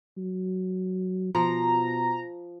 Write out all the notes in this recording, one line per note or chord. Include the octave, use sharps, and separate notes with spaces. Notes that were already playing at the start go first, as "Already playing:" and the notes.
F#3
B2 F3 A#5